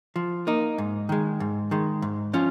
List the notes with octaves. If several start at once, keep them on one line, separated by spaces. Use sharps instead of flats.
F3
A#3 D#4
G#2
D#3 G#3
G#2
D#3 G#3
G#2
F3 C#4 F4